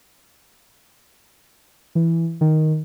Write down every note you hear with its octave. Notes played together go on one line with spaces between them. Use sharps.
E3
D#3